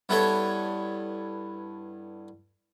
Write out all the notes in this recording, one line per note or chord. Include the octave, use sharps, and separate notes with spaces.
G2 B3 E4 A4 C#5 C#6